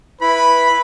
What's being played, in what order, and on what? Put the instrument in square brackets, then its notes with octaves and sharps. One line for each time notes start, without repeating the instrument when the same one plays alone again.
[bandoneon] E4 [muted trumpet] B4 [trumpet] B5